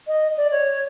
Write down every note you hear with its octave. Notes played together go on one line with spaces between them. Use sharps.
D#5
D5
C#5